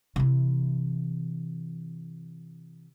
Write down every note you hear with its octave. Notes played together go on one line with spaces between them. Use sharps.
C3 E3